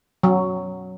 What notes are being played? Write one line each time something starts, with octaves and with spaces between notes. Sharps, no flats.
F#3